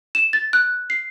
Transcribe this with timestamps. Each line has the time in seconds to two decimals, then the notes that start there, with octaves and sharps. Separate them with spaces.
0.15 E7
0.33 A6
0.53 F#6
0.90 C7